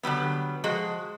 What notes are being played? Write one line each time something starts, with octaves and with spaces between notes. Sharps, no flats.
D3 F#3 G3 B3
F3 G#3 F#4